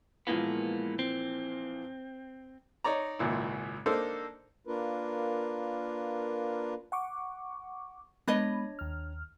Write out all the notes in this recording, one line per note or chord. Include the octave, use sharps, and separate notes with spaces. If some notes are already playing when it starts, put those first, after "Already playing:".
A#2 E3 F3 G#3 A#3 B3
C4
D#4 C#5 D5 A#5
G#1 C#2 A#2 E4
A#3 D4 D#4 A4 A#4 C5
A#3 D4 F4 A#4 B4
F#5 C#6 D6
G#3 B3 D4 C#5 D#5 B5
D#2 F6